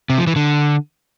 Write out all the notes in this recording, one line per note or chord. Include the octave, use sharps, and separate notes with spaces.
C3
F3
E3
D3